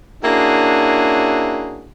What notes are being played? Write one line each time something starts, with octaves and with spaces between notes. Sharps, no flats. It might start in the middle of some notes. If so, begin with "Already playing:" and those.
A#3 C#4 D4 E4 F#4 G#4